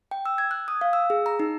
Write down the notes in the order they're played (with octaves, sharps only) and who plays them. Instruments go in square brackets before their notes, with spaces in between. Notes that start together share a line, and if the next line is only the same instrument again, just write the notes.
[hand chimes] G5
E6
G#6
F#6
D#6
F5
E6
G#4
A#5
D#4